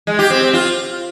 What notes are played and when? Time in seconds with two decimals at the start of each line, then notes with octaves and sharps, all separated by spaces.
0.07 G#3
0.19 G4
0.30 C4
0.42 C4
0.53 F4